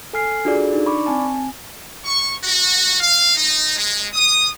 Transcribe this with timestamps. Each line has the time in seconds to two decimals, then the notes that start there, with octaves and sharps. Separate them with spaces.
0.13 A4 G#5 F6 C7
0.45 D4 F4 F#4 G#4 A4 D5
0.72 D4 D#4
0.86 D5 B5 C#6 D6
1.06 C4 G#5 A5
2.05 C#6
2.44 F#4
3.00 F5
3.36 D#4
3.76 G#3
4.14 D#6